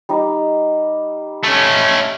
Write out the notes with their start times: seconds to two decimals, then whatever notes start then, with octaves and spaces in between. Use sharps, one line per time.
0.09 G3 D#4
1.43 A3 C#4